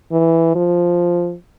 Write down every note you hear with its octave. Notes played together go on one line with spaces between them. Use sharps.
E3
F3